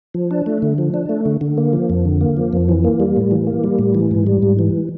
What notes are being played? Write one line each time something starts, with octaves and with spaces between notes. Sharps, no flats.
F3
D4
A3
D3
F3
D4
A3
D3
D3
A#3
F3
F2
D3
A#3
F3
F2
E3
A#3
G3
A2
E3
A#3
G3
A2
E3
G#2
G3
G#2
E3